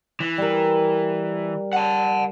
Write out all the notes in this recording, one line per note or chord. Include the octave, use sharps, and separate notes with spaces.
E3
G3 A#4
F#5 A5